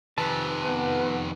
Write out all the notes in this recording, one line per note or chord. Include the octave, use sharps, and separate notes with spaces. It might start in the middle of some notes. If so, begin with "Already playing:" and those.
F2 C3 D#3 B4 G#5 A5
B3